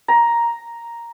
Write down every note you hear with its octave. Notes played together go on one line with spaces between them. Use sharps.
A#5